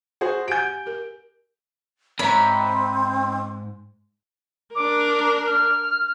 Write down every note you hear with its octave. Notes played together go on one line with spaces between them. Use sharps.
F#4 G#4 C5
G4 F#5 G#5 G6 D7
G4 A#4
E2 G#2 C4 C#5 E5 A#5 B5
D4 A#4 D6
F6